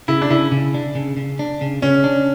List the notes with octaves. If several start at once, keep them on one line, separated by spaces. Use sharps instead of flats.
C#3 E4
D4
C#3 E4
C#3
D4
C#3
C#3
D4
C#3
C#3 C#4
D4